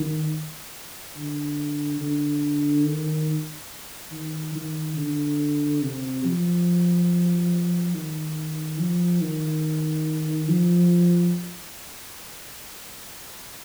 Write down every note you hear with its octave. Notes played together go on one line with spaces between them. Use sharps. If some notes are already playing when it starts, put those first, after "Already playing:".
Already playing: D#3
D3
D3
D#3
D#3
D#3
D3
C3
F3
D#3
F3
D#3
F3